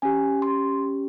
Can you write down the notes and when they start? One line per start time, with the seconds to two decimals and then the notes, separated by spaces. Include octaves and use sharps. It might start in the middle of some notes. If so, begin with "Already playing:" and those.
0.02 C#4 G4 G#5
0.42 C6